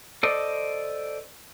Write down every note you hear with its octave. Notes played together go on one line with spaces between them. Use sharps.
A4 C5 D5 D#5